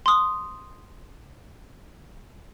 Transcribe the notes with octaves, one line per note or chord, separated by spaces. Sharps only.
C6 D#6